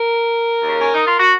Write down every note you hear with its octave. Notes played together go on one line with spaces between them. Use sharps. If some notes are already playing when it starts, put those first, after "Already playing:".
Already playing: A#4
D#2 C#3
C#4
D#4
F4
F#4